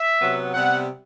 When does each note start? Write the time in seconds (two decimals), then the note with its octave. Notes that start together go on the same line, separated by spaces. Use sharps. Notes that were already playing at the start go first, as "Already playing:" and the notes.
Already playing: E5
0.21 C3 F#3 B3
0.54 C3 G3 B3 F#5